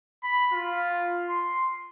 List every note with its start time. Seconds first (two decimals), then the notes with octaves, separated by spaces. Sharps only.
0.23 B5
0.53 F4
1.29 C6